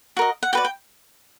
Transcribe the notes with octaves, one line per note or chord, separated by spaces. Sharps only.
F#4 A#4 D#5
F#5
F#4 B4 D5 G5
G5